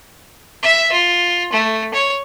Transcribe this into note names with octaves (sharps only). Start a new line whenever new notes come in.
E5
F4
A3
C#5